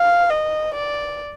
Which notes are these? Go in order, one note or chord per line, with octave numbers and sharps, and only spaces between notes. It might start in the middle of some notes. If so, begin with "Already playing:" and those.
Already playing: F5
D#5
D5